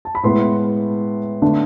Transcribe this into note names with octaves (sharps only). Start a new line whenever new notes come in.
A5
B5
A2 G#3 B3 E4 C6
D3 A3 D4